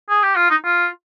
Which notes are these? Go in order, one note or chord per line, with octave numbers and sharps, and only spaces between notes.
G#4
G4
F4
D#4
F4